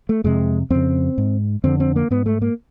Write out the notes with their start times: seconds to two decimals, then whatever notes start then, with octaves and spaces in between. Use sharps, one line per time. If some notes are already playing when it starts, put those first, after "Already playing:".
0.09 A3
0.24 F2 C3 G#3
0.70 F2 C#3 C4
1.18 G#2
1.64 F2 D3 C4
1.80 C4
1.96 A#3
2.11 G#2 B3
2.26 A3
2.42 A#3